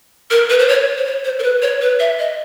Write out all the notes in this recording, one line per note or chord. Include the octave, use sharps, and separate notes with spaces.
A#4
B4
C5
C#5
C5
C#5
C5
A#4
B4
C#5
B4
E5
D#5